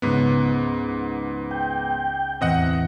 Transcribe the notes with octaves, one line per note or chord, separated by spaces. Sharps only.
C#2 G#2 B3 C#5 F#6
G5
A1 E2 C4 D#5 F#5